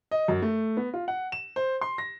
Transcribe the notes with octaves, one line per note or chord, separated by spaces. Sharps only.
D#5
F#2
A3
B3
F4
F#5
E7
C5
C6
A#6